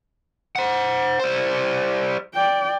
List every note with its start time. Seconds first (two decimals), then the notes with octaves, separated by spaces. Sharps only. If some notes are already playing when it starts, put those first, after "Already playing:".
0.56 C5 F#5
1.20 G3 C5
2.34 D5 G5